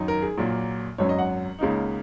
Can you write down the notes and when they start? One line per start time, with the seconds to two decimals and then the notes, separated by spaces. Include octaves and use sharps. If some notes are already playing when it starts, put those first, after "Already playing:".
Already playing: F#2 D#3 F#3 D#4
0.08 A#4
0.22 G#4
0.37 A#1 A#2 F#3 A#3
0.98 G#1 F#2 F#3 C#4 C#5
1.09 D#5
1.19 F#5
1.59 C#2 C#3 A#3 D#4